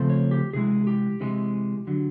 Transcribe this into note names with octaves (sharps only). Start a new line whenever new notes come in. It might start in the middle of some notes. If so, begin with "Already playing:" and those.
Already playing: C#3 F3 A3 C4
C#5
G4
C3 E3 G#3 G#4
G4
C3 E3 G#3
D3 F#3